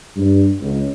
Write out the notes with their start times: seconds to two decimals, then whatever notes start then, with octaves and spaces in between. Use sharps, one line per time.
0.16 G2
0.61 C#2